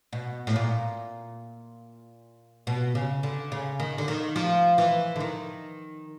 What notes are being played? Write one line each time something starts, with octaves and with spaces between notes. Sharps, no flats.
B2
A2
A#2
B2
C#3
D3
C#3
D#3
D3
D#3
F3
E3
D3
D#3